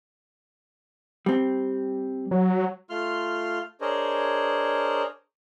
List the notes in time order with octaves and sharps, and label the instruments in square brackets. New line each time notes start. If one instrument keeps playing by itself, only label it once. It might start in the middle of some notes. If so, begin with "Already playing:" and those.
[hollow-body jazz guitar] G3 C4
[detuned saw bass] F#3
[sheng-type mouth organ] A3 F4 C6 F6
D4 G#4 A#4 C5 C#5 D#5